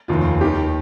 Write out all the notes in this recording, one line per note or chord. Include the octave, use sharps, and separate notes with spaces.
F1 D#2 D#3 F4
D#2 D#3 G4